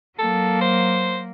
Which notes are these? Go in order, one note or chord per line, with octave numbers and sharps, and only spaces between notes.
F#3 A#3 A4
C5